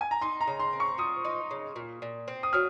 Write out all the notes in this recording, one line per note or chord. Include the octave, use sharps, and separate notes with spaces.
G#5
A#5
D#4 C6
A#5
C#3
C6
C4
C#6
F3 D#6
D#4
C#3
A#2
A#2
C4
D#6
F#3 F6